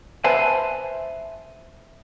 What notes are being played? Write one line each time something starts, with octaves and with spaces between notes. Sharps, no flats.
B4 C5 E5 G#5 A5